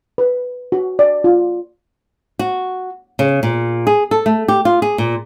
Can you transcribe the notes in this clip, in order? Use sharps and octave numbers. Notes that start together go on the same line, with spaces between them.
B4
F#4
D5
F4
F#4
C#3
A#2
G#4
A4
A3
G4
F4
G#4
A#2